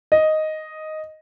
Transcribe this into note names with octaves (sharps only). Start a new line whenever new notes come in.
D#5